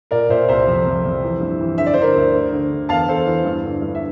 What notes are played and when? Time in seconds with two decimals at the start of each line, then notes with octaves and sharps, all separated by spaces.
0.11 A#2 A#4 D5
0.29 A#2 C5 E5
0.48 C2 C5 E5
0.67 F2
0.86 F2
1.05 F2
1.23 E3
1.41 G2
1.60 E3
1.78 D3 E5
1.87 D5
1.94 C5
1.97 D3 A#4 D5
2.16 D2
2.33 D3
2.53 D3
2.71 D3
2.89 E2 F5 A5
3.08 E2 A4 C5
3.26 E3
3.45 G2
3.64 D3
3.82 G2
3.95 E5